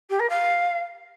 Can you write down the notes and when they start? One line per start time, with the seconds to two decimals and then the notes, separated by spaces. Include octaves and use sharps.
0.09 G4
0.19 A#4
0.29 F5